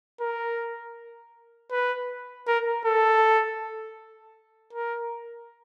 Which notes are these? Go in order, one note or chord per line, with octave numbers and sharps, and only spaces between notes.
A#4
B4
A#4
A4
A#4